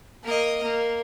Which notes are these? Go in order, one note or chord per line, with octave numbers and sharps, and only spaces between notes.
A#3 D#5
A#3